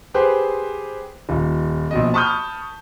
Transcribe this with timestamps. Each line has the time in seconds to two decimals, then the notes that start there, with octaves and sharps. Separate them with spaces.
0.14 G4 G#4 B4 C5
1.29 D#1
1.91 A#1 B2 D#5
2.14 A5 B5 C#6 D#6 F6 G6